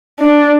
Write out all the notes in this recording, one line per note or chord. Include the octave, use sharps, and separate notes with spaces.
D4